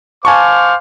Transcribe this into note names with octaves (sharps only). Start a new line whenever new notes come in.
C5 F5 G#5 A5 C#6 D6